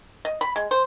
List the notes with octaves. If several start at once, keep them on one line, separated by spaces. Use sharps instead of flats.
D#5
B5
G#3
C5